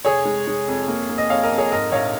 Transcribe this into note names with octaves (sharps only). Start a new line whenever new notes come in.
F1 G#4 C#5
G#3
G#3
F2
A#3
A#3
D#5
F2 C#5 F5
A#4 D#5
F2
G#4 C#5
G#2 A#4 D#5
A#1 C#5 F5